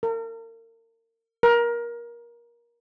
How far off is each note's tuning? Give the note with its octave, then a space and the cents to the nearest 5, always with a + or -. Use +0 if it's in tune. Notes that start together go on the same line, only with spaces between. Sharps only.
A#4 -40
A#4 +20